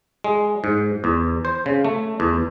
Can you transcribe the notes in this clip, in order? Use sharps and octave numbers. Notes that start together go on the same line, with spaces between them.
G#3
G#2
E2
C5
C#3
A3
E2